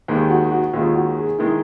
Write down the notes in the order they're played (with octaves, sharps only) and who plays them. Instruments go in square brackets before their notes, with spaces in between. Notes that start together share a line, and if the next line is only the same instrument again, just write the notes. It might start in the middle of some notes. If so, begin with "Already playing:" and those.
[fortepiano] D#2 D#3 G#3 [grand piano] G4
[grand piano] F#4
F#4
[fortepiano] D#2 D#3 G#3 [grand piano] F4
[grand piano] F#4
G#4
[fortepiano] D#3 G#3 [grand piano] E4